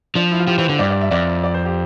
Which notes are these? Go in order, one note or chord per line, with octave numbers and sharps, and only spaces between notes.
F3 D4
E4
F4
F3 G4
E3 C5
D3 C5
G2 D5
D5
E5
F2 D5
D5
C5
G4